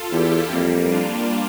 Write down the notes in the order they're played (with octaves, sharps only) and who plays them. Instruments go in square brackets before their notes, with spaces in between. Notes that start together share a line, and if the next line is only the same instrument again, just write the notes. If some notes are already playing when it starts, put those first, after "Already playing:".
Already playing: [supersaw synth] F4 A4
[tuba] E2 [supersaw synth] E4 G4
[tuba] F2 [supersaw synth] G3 A#3
[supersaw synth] D4 F4